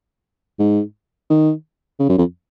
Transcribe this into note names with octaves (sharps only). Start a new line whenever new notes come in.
G#2
D#3
C#3
F#2
F2